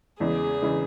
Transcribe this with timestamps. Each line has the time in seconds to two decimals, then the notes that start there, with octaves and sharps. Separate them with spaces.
0.20 E2 C#3 E3 G#3 G#4
0.62 C#3 E3 G#3